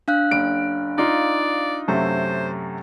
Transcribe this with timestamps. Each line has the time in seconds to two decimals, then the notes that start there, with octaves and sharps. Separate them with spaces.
0.08 D4 F5 F#6
0.31 F#1 D7
0.98 D#4 F4 D5
1.88 F#2 C3 A3 C5